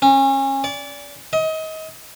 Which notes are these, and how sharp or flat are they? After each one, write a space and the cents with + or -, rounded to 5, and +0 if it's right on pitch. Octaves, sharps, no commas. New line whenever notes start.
C#4 -30
D5 -30
D#5 +30